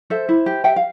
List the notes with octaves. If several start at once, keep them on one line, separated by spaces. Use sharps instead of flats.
A4 C5 E5
E4
G4
G4 E5 G5
F5